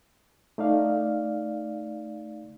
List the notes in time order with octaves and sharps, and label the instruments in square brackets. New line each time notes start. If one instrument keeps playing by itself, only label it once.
[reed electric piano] A3 D#4 D5 F5